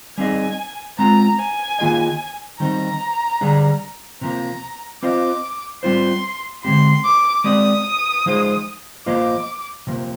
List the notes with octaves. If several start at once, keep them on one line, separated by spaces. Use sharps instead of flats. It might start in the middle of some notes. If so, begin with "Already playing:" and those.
G3 C4 D#4 G#4 D#5 G#5
G#3 C4 F4 A#5
G#5
D#3 A#3 F4 G#4 D#5
D#3 G3 C4 D#4 A#5
D3 G3 D4 G#4
C3 F3 A#3 A#5
C4 F4 C5 D#5 D6
G3 C4 F4 C5 C6
D3 G#3 C4 G4 C6
D6
G#3 C4 G4 D5 D#6
F3 G#3 D#4 G#4 C5
F3 A#3 F4 C5 D#5 D6
C3 F3 A#3